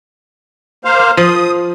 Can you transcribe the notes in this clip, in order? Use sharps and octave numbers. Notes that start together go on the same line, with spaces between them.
A#3 C5 F5
F3 D#6